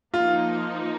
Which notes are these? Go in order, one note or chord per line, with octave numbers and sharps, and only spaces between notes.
F3 A#3 D#4 F4